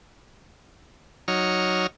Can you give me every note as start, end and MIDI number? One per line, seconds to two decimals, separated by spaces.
1.28 1.87 54
1.28 1.87 63
1.28 1.87 73
1.28 1.87 89